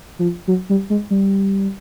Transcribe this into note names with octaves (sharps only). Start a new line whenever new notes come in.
F3
F#3
G3
G#3
G3